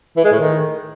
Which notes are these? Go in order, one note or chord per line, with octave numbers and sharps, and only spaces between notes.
E3
G#3
A2
D#3